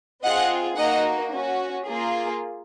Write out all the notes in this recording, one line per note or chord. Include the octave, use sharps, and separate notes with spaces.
C4 F4 G#4 D#5 F#5
A#3 D#4 F#4 D#5 F#5
C#4 F#4
A#3 F4 G#4